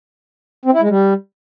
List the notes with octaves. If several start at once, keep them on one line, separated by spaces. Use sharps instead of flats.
C4
E4
G#3
G3